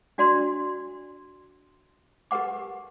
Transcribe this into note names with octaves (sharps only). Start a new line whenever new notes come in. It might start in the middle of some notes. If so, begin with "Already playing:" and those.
D4 F#4 D5 A#5 C6
G4 A#4 B4 F#5 D6